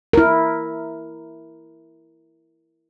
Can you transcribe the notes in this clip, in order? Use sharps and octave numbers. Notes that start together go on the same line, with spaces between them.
E4 A#4